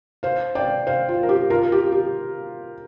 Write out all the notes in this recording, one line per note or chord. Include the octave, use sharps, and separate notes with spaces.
C5 F5
D5 G5
C5 F5
F4
A#4
G4
F4 A#4
G4
G4